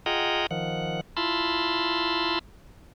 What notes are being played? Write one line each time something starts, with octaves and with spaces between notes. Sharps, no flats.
F4 G#4 D#5 F#5 G5 A#5
D#3 F3 F#5
E4 F4 A5 B5 C6